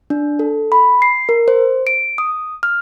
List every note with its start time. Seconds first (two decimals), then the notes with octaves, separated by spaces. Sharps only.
0.10 D4
0.39 A4
0.72 B5
1.02 C7
1.29 A#4
1.48 C5
1.87 D7
2.18 D#6
2.63 F6